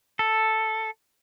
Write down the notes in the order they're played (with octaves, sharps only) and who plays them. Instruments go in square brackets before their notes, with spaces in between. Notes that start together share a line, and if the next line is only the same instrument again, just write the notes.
[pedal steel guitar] A4